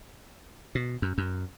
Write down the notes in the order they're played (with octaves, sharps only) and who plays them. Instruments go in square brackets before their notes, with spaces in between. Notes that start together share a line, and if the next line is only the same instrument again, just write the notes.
[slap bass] B2
F#2
F#2